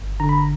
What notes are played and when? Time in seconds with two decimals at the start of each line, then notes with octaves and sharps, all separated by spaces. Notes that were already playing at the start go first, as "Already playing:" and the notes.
Already playing: G1
0.20 D3 A#5
0.29 B5
0.38 A#5